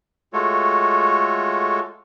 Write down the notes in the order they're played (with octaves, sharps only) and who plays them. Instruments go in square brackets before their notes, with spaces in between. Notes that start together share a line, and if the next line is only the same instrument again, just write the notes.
[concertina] G#3 A3 F4 F#4 A4 C#5